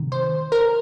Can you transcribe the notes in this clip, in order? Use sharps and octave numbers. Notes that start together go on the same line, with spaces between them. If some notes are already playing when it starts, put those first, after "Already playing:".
Already playing: C3 D#3
C5
A#4